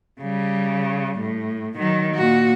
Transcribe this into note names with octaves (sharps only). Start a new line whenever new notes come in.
C#3 G3
A2
D#3 F#3
A#2 F#4